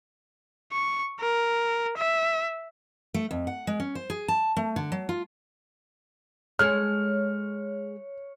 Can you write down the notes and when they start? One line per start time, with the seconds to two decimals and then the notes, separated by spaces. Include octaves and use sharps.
0.72 C#6
1.20 A#4
1.97 E5
3.14 A3
3.31 F2
3.47 F#5
3.67 G#3
3.80 C#4
3.95 C5
4.10 G#4
4.28 A5
4.57 A3
4.76 D3
4.92 F#3
5.09 F4
6.59 G#3 G#4 A4 C#5 F6